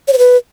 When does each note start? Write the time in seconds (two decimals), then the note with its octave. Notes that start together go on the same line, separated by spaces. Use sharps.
0.08 C#5
0.13 C5
0.18 B4